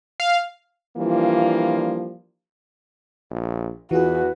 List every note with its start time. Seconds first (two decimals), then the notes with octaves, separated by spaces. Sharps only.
0.20 F5
0.97 E3 F3 G3 A#3 D4 F4
3.30 A#1
3.91 E2 E3 F4 F#4 G#4 B4